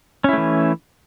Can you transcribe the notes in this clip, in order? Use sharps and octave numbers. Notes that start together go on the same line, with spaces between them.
E3 A3 C#4 E4